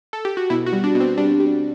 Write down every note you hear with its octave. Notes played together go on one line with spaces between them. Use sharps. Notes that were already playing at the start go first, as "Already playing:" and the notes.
A4
G4
F#4
B2 E4
F#4
G3
D4
B2
C4
G3 D4
G3